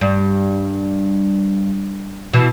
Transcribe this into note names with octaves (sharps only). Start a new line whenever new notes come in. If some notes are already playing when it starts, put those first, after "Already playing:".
G2
B2 E3